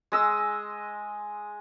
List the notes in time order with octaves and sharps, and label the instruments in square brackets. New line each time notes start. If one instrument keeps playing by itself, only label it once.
[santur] G#3 D#5 E6